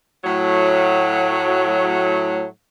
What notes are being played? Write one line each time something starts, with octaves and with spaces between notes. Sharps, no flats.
A2 F#3